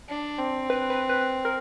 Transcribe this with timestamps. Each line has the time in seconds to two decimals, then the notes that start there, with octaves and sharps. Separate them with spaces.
0.09 D4
0.39 C4
0.70 B4
0.90 B4
1.09 B4
1.45 A#4